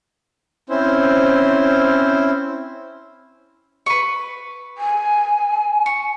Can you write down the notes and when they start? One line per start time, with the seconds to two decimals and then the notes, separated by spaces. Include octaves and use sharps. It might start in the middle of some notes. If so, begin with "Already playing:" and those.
0.70 C4 C#4 E4 C5
3.86 B4 C#6
4.78 G#5
5.86 C#6